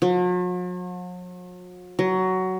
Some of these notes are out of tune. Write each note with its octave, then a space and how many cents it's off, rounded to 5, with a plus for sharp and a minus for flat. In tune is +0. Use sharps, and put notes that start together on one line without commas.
F#3 -45
F#3 +15